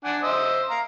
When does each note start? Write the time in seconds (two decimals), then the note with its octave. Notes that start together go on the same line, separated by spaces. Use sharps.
0.04 D4 F#5 G#5
0.22 C5 D#5 E5
0.70 F5 A#5